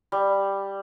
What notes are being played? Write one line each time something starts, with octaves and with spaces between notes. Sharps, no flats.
G3